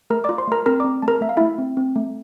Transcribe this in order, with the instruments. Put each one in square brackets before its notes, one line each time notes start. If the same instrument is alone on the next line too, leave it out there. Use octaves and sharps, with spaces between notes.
[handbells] A3 A#4 A#5
F4 D5 D6
C5 C6
A3 A#4 A#5
C4 A#4 A#5
C4 D5 D6
A3 A5
A#4 A#5
A3 E5
F5
A3 E4 E5
C4
C4
A3